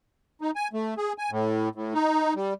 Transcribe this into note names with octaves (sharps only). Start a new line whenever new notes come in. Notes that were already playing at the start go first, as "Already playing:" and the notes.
D#4
G#5
A3
G#4
G#5
A2
A2
D#4
G3